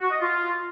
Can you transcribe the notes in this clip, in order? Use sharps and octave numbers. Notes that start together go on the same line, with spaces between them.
F#4
D#5
F4